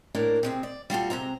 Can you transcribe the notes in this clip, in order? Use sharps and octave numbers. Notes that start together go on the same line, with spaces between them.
A2 A#3 D4 A#4
C3 G#3 C4
D5
G3 F4 F#4 A4
C3 G#3 C4 A#5